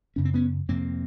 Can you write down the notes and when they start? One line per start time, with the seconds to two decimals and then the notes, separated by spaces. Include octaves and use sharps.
0.16 F#2 C#3 C#4
0.25 C4
0.34 B3 C#4
0.68 F2 C3 A#3 C4